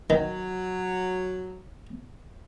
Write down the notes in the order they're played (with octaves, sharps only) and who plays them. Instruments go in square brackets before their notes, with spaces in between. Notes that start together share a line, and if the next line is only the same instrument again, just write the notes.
[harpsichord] D#3 [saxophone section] F#3